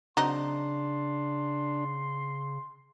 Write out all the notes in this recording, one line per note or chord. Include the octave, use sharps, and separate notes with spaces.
C#3 F#3 C4 D4 D#4 C6